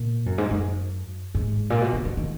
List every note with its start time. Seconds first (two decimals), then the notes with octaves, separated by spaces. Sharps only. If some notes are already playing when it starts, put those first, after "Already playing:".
Already playing: A#2
0.26 F#2
0.38 G#2
0.51 F#2
1.35 G#2
1.70 A#2
1.81 B2
1.93 D#3
2.05 F3
2.17 D#3